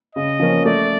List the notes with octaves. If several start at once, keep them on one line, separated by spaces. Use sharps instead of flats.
C#3 D#5
F3 A#3 C#4
A3 D5